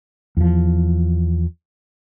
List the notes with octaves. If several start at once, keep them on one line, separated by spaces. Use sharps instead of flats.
E2 F3